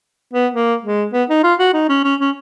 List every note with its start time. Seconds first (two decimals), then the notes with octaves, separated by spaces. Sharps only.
0.33 B3
0.54 A#3
0.83 G#3
1.13 B3
1.29 D#4
1.43 F4
1.59 F#4
1.74 D#4
1.89 C#4
2.04 C#4
2.20 C#4